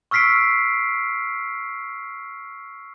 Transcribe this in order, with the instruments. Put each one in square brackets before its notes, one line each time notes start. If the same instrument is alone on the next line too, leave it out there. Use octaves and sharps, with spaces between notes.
[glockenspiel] C#6 E6 F6 B6 C7 D7